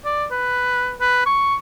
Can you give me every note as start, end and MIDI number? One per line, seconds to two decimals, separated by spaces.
0.05 0.25 74
0.31 0.93 71
1.01 1.21 71
1.26 1.55 85